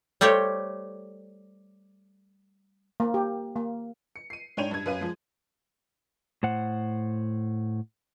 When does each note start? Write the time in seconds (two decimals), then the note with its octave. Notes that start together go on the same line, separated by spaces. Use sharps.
0.21 G3 A3 G4 C5 C#5
3.00 A#3
3.14 G4
3.56 A#3
4.16 C#7
4.30 C7 D#7
4.57 G#2 D4 C#5 G5 D#7 F7
4.71 G2 G#6
4.86 F#2 B4 F5 D#7
5.01 F3 G#3
6.43 A2 C5 F#5